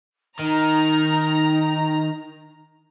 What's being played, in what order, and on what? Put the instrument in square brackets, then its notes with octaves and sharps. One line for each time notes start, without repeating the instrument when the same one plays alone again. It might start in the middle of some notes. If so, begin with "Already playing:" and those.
[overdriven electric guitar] D#3 [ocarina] D#4 [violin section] A#5